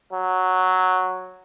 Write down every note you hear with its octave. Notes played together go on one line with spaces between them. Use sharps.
F#3